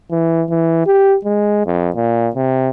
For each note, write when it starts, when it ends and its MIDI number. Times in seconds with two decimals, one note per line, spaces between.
0.11 0.44 52
0.50 0.85 52
0.86 1.17 67
1.25 1.61 56
1.66 1.90 41
1.96 2.29 46
2.35 2.70 48